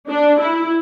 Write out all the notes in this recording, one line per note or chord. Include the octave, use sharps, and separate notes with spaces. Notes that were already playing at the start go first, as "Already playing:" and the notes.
D4
E4